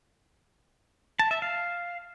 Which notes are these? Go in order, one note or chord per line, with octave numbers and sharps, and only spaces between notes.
A5
E5
F5